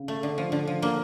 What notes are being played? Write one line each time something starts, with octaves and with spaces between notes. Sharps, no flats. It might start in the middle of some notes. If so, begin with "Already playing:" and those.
Already playing: C#3
A3
D3
F3
D3
F3
D3 A#3